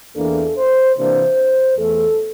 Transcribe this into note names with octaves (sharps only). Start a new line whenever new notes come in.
E2 E3 A#3 D4 A4
C5
C3 E3 A#3 D4 C5
E2 E3 A3 A4